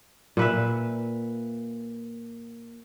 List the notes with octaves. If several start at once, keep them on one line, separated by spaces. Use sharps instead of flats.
A#2 B4 E5